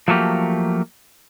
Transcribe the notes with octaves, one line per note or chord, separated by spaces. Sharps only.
F3 F#3 A3 A#3 G4